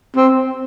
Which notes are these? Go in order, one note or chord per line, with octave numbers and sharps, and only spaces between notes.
C4